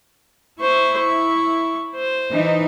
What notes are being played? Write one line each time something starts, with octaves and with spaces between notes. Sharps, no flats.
E4 C5 C#6
C#6
C5
E3 D#4 D#5